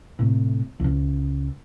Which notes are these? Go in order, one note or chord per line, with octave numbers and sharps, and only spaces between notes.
A2 C3
C#2 C#3